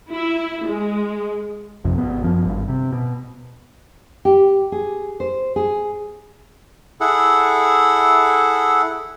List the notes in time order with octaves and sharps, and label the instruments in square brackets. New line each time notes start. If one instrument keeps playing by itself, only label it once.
[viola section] E4
G#3
[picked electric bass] A1 F2 C3
G#1 G2 B3
F#2 F3
G#1 G2
C3
B2
[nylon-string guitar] G4
G#4
C5
G#4
[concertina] E4 G#4 A4 F#5